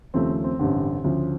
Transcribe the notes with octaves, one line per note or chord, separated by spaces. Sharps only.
D#2 C#3 F3 A3 C4
C4
A1 G2 D3 C4
D2 C#3 F3